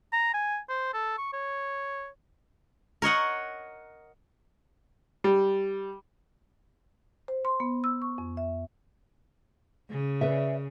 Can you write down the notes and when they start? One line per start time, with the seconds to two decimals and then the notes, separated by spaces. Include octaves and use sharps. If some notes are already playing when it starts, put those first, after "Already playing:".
0.12 A#5
0.34 G#5
0.69 C5
0.94 A4
1.18 C#6
1.33 C#5
3.02 A#4 C#5 D#5 F#5
5.24 G3
7.28 C5
7.45 C6
7.60 B3
7.84 E6
8.02 C#6
8.18 F2
8.37 E5
9.90 C#3
10.21 B4 D5 E5